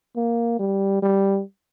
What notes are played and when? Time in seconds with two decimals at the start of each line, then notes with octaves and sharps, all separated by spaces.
0.16 A#3
0.59 G3
1.03 G3